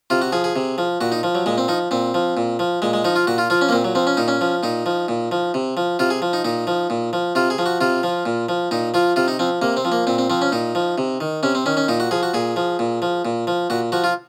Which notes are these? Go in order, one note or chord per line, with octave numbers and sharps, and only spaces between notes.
C3 F4
F#4
F3 G#4
G#4
C3
F3
A#2 F#4
D#4
F3
F#3
A#2 G#3
C4
F3 D#4
A#2 C4
F3
A#2
F3
A#2 G#3
G#3
F3 D#4
F4
A#2 F#4
F4
F3 F4
C#4
A#3
A#2 C4
F#3
F3 C4
C#4
A#2 D#4
C#4
F3
A#2 D#4
F3
A#2
F3
C3
F3
C3 F4
G#4
F3
D#4
A#2 D#4
F3
A#2
F3
C3 F4
G#4
F3
F#4
C3 F4
F3
A#2
F3
A#2 D#4
F3 F4
C3 F4
D#4
F3 C4
C3 A#3
C4
F3
A#3
A#2 C4
C4
F3 C4
C#4
A#2 D#4
F3
C3
D#3
C3 C#4
C4
D#3 C#4
C#4
A#2 D#4
F#4
F3 G#4
F#4
A#2 G#4
F3
A#2
F3
A#2
F3
A#2 F#4
F3 F#4
F4